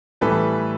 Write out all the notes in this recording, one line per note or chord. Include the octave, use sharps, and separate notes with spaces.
A2 E3 G3 A4 B4